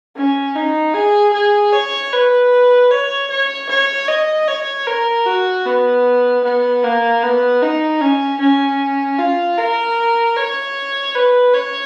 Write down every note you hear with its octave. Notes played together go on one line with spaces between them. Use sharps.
C#4
D#4
G#4
G#4
C#5
B4
C#5
C#5
C#5
D#5
C#5
A#4
F#4
B3
B3
A#3
B3
D#4
C#4
C#4
F4
A#4
C#5
B4
C#5